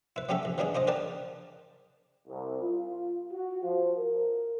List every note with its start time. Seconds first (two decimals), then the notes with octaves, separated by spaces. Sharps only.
0.16 E4 B4
0.29 F#3 G3 C#4 G4 A4 E5
0.45 A#1
0.58 E3 F#3 G3 D4 D#4 G#4
0.75 D4 F4 C5 D#5
0.87 A#4 B4 D5 G5 A5
2.27 C2
2.61 F4
3.30 F#4
3.62 F3
3.96 A#4